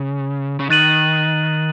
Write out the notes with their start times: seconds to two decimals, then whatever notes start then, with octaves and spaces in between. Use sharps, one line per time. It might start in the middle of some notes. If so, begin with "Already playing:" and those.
Already playing: C#3
0.60 C#3
0.70 D#3 F#6 A6 D#7 F#7